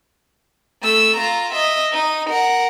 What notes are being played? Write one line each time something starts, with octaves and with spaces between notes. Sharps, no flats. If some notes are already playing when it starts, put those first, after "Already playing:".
A3 E6
F4 A#5
D#5 E5
D#4 D#7
A#4 F#5